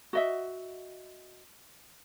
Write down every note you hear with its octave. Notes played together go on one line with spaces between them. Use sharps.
F#4 D#5 E5